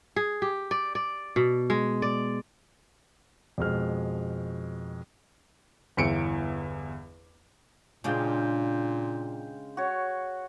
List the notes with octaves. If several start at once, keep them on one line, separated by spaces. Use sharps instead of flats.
G#4
G4
D5
D5
B2
G#3
D5
F2 B2 G#3 F6
G1 E2 E4 C#7 D7
A#2 C#3 G#3 D4 G4 F5 G5
F#4 C#5